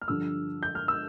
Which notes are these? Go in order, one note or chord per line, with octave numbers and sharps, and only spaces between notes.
F6
G2 D3 F3 E6
G6
F6
E6